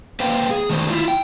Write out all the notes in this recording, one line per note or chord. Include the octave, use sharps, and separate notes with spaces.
A#3 B4 C5 F5 G5
G#4
D#3 A3 C5
E4 F4
G5